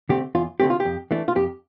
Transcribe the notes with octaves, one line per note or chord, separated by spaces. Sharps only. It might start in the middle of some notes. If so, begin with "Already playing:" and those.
D3 A3 C4 G4
E2 F4
D3 A3 C4 G4
F4
G4
F2
E3 A3 D4
F4
F2 G4